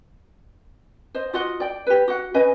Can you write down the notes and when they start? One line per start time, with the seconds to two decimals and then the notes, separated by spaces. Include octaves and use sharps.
1.15 C5 D#5
1.33 F4 F#4 D#5 F#5
1.60 D5 G5
1.87 G4 B4
2.08 F#4 F#5
2.34 C#4 B4 D#5 G#5